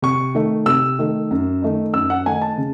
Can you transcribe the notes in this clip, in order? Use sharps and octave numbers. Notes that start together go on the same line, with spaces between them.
C3 C#6
D#3 A3
C3 E6
D#3 A3
F#2
D#3 A3 D#4
F#2 E6
F#5
D#3 A3 D#4 G#5
A5
C#3